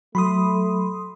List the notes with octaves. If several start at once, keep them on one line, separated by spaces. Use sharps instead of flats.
F#3 A3 B5 C6 D#6